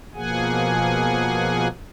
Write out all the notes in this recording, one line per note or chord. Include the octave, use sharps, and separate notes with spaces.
B2 F3 A#3 G#4 F#5 G#5